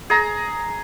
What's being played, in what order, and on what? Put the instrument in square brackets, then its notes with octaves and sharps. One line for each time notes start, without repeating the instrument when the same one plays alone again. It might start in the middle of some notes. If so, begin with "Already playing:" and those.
[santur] G#4 A#5